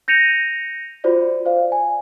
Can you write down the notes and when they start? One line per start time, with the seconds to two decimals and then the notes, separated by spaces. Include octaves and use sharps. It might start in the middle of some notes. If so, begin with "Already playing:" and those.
0.08 G6 A#6 C#7 D#7 F7
1.04 F4 F#4 C5 D5
1.45 C5 D5 F5
1.72 G#5